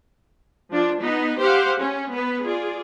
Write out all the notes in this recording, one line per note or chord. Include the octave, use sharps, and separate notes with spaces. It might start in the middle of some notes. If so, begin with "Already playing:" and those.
F3 D4 F4
B3 D#4 B4
G4 C5 F5 F#5
C#4
B3 B4
F4 G#4 D5